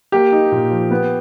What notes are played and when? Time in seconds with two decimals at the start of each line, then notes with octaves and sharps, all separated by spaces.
0.12 A#3 G4
0.32 D#4
0.52 A#2
0.71 F3
0.91 B3